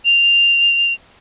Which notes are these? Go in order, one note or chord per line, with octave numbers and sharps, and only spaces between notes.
F7